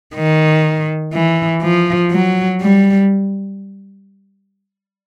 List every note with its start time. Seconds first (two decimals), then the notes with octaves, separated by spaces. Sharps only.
0.15 D#3
1.13 E3
1.63 F3
2.12 F#3
2.61 G3